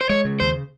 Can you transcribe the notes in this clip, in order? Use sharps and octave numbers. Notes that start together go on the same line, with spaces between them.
C5
G#3 C#5
C#3
D#2 C5